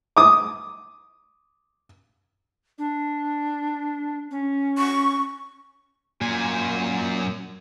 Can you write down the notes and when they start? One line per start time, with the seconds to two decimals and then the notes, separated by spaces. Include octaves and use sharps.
0.17 D6 D#6
2.78 D4
4.31 C#4
4.78 C#6
6.21 F#2 A#2 G#5